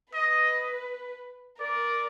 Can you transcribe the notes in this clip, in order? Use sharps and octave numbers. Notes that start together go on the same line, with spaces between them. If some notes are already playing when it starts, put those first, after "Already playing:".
B4 D#5
A#4 D5